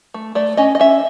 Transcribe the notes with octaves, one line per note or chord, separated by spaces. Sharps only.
A3
A3 D5
C#4 D#5
D#5
C#4 E5